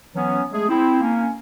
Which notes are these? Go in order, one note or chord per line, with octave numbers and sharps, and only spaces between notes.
E3 F#3 B3 C#4
G#3 A3 G#4
C4 E4
A#3 C#4